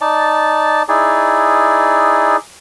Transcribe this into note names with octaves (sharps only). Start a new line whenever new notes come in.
D#4 D5 A5
D#4 E4 G#4 D5